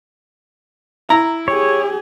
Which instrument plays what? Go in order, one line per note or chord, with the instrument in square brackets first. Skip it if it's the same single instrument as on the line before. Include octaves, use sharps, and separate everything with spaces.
[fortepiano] E4 [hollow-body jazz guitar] A#5
[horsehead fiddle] G4 G#4 [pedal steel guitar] C#5